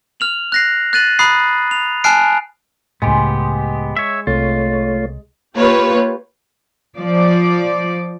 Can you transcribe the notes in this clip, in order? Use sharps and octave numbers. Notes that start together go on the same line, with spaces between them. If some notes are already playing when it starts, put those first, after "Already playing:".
F6 F7 F#7
F#6 A#6 C7
F#6 A6 D#7 F#7
A#5 B5 D#6 F#6 C7
F7
G#5 A5 F6 F#6 C7 D7
C#2 A2 G#3 B3 G4
C#5 E5
C2 A3 F4 C#5
A#3 F4 G4 B4 C#5
F3 D5